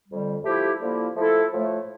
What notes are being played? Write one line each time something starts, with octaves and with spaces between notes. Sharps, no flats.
F2 D3 G3
F3 A3 E4 G4
D3 F3 A#3 E4
F3 A3 E4 A4
A2 F3 A3